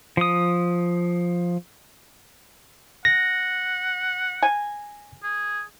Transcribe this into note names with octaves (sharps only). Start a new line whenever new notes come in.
F3 D#6
F#5 A#6
G#5
G#4